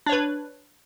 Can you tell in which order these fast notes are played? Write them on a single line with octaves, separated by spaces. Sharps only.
D4 C#5 B4